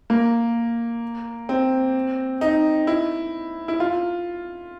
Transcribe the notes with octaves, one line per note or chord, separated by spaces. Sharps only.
A#3
C4
D#4
E4
E4
F4